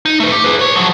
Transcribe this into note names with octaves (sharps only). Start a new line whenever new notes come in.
D#4
A3 B4
G4
G#4 B4
B4 C#5
F3 F#3